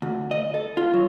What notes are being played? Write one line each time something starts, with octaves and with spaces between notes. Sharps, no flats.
D2
D#5
A4
F4
F#3